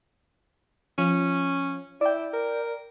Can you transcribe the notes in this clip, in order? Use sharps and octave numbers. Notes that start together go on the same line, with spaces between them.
F3 C#4
E4 D5 G5
A#4